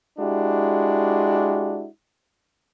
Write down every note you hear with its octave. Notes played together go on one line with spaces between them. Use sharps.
G#3 D4 E4 F#4 G4